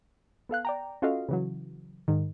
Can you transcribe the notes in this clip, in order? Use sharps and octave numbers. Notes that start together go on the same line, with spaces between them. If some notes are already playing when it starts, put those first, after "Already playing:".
B3 A4 F5 F#6
D5 G5 A#5
C#4 F4 F#4 A4 D#5 F5
C#3 E3 F#3
G#2 D#3